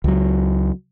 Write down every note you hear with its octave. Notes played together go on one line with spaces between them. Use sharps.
C#2 F#3